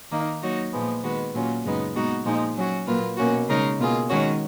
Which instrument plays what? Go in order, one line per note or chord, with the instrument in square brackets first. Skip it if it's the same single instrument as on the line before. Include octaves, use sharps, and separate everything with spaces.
[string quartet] D#3 A#3 D#4
F#3 A#3 D#4 F#4 C#5
A#2 F3 G#3 B3
D#3 G#3 B3 F#4
A#2 F#3 C#4 F4
F#2 C#3 G#3 B3 D#4
A#2 G#3 B3 D#4 F#4
A#2 F3 G#3 D#4
F#3 C#4 F#4
A#2 F#3 A#3 F4 B4
B2 A#3 C#4 F#4
C#3 G#3 D#4 A#4 C#5
B2 A#3 F4 G#4
D#3 G#3 C#4 F#4 C#5